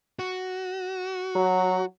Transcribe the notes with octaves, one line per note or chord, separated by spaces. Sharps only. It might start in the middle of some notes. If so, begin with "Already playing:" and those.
F#4
F#3